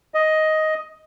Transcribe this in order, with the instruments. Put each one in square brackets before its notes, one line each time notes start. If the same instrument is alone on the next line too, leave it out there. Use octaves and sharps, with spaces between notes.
[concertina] D#5